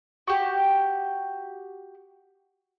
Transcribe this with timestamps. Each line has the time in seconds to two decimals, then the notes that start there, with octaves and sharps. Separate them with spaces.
0.28 F#4 G4